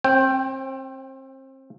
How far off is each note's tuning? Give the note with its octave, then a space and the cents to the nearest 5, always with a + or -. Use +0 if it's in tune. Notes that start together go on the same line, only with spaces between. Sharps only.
C4 +30 G5 +0